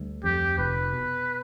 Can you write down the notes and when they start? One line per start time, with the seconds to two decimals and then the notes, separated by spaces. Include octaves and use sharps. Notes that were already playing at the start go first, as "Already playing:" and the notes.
Already playing: D2 G3
0.24 F2 G4
0.59 F1 B4
0.93 B2